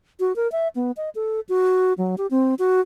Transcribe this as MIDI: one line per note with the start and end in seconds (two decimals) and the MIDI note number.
0.20 0.35 66
0.36 0.50 70
0.52 0.68 76
0.75 0.92 59
0.97 1.10 75
1.15 1.40 69
1.49 1.93 66
1.98 2.15 54
2.18 2.27 67
2.31 2.55 60
2.59 2.81 66